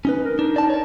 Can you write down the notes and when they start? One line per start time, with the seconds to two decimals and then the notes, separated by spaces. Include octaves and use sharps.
0.05 C#4 D#4 B4
0.24 A#4
0.39 D4 D#4
0.56 D5 A5
0.70 C#5 D5